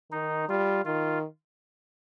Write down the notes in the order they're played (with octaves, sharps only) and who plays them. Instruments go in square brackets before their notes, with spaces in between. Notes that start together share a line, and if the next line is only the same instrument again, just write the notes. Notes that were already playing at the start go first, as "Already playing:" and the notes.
[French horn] D#3 [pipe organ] D#4
[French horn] G3 [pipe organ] F4
[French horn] D#3 [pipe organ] F4